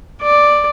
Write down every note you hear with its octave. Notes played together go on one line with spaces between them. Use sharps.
D5